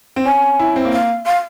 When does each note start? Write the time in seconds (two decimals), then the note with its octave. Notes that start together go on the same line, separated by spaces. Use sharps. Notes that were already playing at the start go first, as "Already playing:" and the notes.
0.16 C4
0.25 C#4 G#5
0.59 E4
0.76 C4
0.85 A#3
0.93 F5
1.26 F5